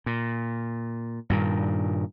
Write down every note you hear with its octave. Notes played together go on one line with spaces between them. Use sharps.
A#2
G2 A#2 D#3